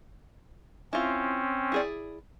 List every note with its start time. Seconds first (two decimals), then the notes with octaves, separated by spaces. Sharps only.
0.93 C4 C#4 E4 F4
1.72 E4 G#4 D5